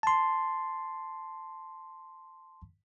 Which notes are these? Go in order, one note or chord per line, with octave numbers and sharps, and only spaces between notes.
A5 C6